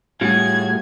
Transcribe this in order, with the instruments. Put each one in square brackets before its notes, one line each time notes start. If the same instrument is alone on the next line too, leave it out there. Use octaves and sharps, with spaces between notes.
[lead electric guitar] A2 [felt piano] G3 [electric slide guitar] F4 F#4 G#4 [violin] G#6